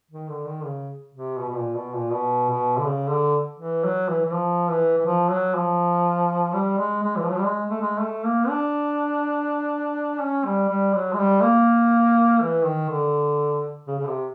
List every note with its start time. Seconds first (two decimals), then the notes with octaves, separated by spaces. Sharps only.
0.11 D#3
0.29 D3
0.47 D#3
0.65 C#3
1.14 C3
1.39 B2
1.49 B2
1.57 A#2
1.76 B2
1.94 A#2
2.13 B2
2.50 B2
2.78 D3
2.86 C#3
3.10 D3
3.59 E3
3.84 F#3
4.09 E3
4.25 E3
4.33 F3
4.70 E3
4.97 E3
5.06 F3
5.31 F#3
5.55 F3
6.53 G3
6.77 G#3
7.02 G#3
7.16 E3
7.23 F3
7.30 F#3
7.37 G3
7.45 G#3
7.70 A3
7.81 G#3
8.00 A3
8.24 A#3
8.49 D4
10.21 C#4
10.45 G3
10.69 G3
10.94 F#3
11.13 G#3
11.19 G3
11.43 A#3
12.42 E3
12.65 D#3
12.89 D3
13.88 C#3
13.99 C#3
14.07 C3